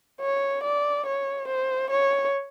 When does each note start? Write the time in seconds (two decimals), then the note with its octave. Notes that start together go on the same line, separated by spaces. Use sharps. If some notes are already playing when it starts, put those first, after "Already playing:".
0.21 C#5
0.63 D5
1.06 C#5
1.47 C5
1.90 C#5